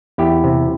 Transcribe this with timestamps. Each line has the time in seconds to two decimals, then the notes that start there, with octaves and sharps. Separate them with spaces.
0.18 E2 E4 G4
0.44 C3